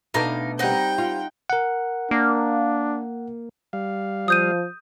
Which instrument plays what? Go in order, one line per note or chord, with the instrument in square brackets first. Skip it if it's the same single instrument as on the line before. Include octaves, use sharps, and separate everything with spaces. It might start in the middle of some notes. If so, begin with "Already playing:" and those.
[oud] B2 A3 D4 [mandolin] D#4 F5 [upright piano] A#6
[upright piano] G3 C4 [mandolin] D#4 F#5 [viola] G5
[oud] F4
[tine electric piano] A#4 F#5
[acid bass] A#3 [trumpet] D4
[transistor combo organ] G3 F5
[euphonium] F3 [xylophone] D#6 G6 D#7